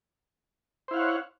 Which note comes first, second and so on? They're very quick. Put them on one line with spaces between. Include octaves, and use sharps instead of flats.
C5 E4 F5 F#5 C#5